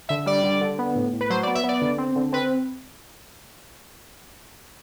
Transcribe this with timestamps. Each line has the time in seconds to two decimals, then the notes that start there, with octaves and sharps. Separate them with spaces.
0.09 D3 E5
0.26 G3 D5
0.44 D3
0.61 D3
0.79 B3
0.95 A2
1.13 A2
1.21 B4
1.30 F#3 C5
1.43 D5
1.47 B3
1.55 E5
1.64 B3 D5
1.81 D3
1.98 C4
2.15 D3
2.32 C4 B4